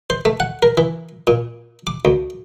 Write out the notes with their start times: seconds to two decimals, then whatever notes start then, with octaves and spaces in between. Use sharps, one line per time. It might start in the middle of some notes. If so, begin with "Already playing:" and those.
0.10 C5
0.25 A3
0.40 F#5
0.63 A#4
0.77 E3
1.27 A#2
1.87 D6
2.05 D2